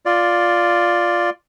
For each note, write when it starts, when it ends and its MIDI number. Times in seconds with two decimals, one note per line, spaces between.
0.06 1.30 65
0.06 1.30 74